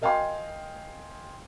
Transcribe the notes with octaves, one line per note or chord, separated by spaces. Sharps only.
A#4 D#5 F5 G5 G#5 C6